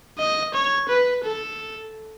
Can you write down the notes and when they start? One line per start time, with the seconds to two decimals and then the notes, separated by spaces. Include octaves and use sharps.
0.19 D#5
0.54 C#5
0.89 B4
1.24 A4